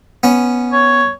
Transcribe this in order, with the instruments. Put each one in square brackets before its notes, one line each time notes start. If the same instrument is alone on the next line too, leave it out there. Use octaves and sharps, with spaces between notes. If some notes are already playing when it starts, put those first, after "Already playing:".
[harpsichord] B3 C#4
[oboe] C#5